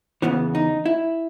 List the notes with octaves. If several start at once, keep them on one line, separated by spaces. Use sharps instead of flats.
E2 C#3 E3 B3
D#4
E4